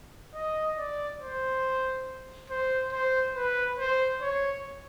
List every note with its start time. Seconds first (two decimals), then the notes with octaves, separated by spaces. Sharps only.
0.35 D#5
0.78 D5
1.20 C5
2.50 C5
2.93 C5
3.35 B4
3.79 C5
4.21 C#5